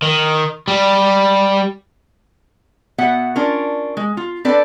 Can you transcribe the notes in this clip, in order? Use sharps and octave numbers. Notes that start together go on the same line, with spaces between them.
D#3
G3
B2 B3 E5 F#5
C#4 D4 F4 A#4
G#3
F4
C4 D4 A4 B4 D5